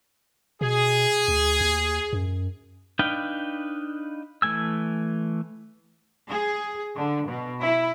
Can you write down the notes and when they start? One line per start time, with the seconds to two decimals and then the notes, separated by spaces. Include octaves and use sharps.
0.61 B2 G#4
1.28 D2
1.60 D#2
2.13 F#2
2.99 D4 D#4 B4 F5 G5
4.42 E3 A3 G#5 E6
6.30 G#4
6.96 D3
7.27 B2
7.62 E4